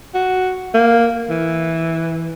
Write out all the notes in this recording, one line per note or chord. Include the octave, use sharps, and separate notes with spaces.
F#4
A#3
E3